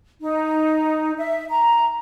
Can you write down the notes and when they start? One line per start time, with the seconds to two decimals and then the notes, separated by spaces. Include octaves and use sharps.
0.21 D#4
1.17 E5
1.49 A#5